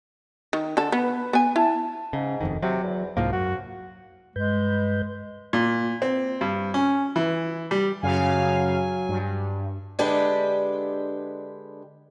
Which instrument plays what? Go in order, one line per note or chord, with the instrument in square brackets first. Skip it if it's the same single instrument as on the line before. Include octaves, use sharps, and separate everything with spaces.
[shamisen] D#3
D3 A4
[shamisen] B3 [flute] B4
[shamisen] B3 G#5
[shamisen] E4 [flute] A5
[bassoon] G#2 [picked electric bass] C#3
[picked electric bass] F#1 F2 D#3
[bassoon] C3 [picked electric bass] F#3
[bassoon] E2
[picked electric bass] C2 G#2 A#3 [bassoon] F3
[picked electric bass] F#2 [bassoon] F#4
[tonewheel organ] G2 B4 G6 [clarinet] G#3
[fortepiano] A#2
C4
G2
C#4
E3
G3
[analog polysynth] F#2 C#3 F5 [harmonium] F#3 G#5
[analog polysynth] G2
[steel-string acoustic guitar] D3 G#3 D4 G4 B4